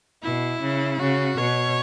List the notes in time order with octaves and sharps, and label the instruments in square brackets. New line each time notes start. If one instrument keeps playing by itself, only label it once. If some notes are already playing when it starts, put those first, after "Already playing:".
[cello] B2 [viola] E4
[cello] C#3
[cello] C#3 [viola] F#4
[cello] B2 [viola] C#5